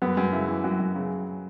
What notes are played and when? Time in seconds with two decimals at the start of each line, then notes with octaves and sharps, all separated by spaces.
0.02 F#2 B3
0.17 F#2
0.33 C#3 E4
0.48 E3
0.64 F#2 F#4
0.80 F#2
0.95 C#3